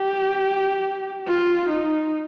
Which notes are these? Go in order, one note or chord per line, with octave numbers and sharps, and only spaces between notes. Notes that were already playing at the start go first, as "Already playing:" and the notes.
Already playing: G4
F4
D#4